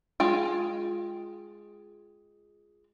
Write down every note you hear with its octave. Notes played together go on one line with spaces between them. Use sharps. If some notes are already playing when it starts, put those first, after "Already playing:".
G#3 F4 G5